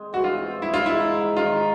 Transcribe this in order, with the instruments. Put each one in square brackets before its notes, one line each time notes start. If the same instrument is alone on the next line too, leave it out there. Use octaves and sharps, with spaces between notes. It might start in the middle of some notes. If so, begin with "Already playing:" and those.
Already playing: [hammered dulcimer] G#3 C4
[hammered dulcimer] E3 [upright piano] F#4
[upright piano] F4
[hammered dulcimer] C4
[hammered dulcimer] G#3 [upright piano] E4
[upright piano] F4
[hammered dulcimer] G#2 [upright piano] E4
[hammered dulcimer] G#2
[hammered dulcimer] D#3 [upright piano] F4